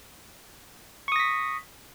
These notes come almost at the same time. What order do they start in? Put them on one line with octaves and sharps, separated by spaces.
C#6 D#6 A#6 B6